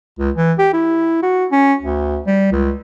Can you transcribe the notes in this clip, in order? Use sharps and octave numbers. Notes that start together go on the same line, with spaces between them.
C#2
E3
G4
E4
F#4
C#4
D2
G3
C#2